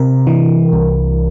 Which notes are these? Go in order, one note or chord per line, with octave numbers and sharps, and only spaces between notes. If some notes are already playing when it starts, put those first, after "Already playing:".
Already playing: C3 A#4
E3
C2